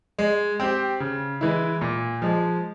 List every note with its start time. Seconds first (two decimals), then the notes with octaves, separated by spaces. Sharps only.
0.19 G#3
0.60 C4 G4
1.00 C#3
1.41 E3 G#3 E4
1.81 A#2
2.22 F3 G#3